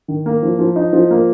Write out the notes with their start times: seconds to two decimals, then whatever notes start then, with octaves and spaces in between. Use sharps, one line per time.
0.08 D#3
0.26 A#3
0.42 F3
0.59 F3
0.76 D#4
0.93 F3
1.11 A#3